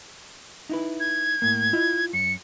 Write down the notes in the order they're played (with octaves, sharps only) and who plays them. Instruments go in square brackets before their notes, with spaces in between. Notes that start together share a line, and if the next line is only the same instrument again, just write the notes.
[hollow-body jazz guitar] D#4 E4 B4
[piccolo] G#6
[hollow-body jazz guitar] A2 A#3
E4 F4 D#5
[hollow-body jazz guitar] F#2 [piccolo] C#7